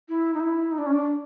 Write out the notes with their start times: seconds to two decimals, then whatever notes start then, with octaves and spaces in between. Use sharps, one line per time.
0.09 E4
0.34 D#4
0.40 E4
0.72 D#4
0.78 D4
0.86 C#4
0.93 D4